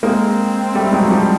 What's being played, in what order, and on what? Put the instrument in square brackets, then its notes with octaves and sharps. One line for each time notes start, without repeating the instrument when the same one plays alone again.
[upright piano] G#3 A#3 [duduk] C4
[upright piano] G3 A3
F#3 G#3
F3 G3